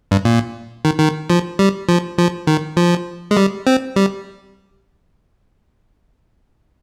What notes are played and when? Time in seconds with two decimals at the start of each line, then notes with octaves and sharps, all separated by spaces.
0.11 G2
0.25 A#2
0.85 D#3
0.99 D#3
1.30 F3
1.59 G3
1.89 F3
2.18 F3
2.47 D#3
2.77 F3
3.31 G#3
3.37 G3
3.67 C4
3.96 G3